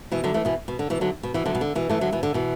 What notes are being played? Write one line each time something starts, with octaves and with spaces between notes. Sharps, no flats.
B2 E3
D3 F#3
E3 A3
B2 E3
B2
D3
B2 E3
D3 F#3
B2
B2 E3
D3 F#3
B2
D3
B2 E3
E3 A3
D3 F#3
B2 E3
D3
B2 E3